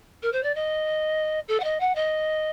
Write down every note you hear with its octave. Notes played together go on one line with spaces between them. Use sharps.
A#4
C5
D5
D#5
A4
F#5
D#5
F#5
D#5